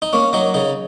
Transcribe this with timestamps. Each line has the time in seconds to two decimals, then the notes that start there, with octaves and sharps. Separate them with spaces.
0.02 D#4
0.13 A#3 C#4
0.33 F#3 D#4
0.54 C#3 D#4